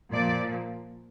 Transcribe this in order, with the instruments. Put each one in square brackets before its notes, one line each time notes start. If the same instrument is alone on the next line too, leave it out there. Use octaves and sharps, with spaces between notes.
[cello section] A#2 F3 D5